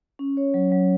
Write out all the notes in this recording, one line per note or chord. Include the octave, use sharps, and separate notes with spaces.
C#4
C#5
F#3
F#3